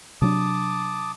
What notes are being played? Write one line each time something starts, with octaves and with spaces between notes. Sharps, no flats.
C3 F#3 D4 A5 D6 D#6